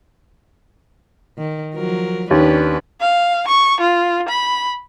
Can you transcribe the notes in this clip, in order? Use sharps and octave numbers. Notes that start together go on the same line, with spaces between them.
D#3
F3 F#3 A#4
D#2 C#4 D4 B4
F5
C#6
F4
B5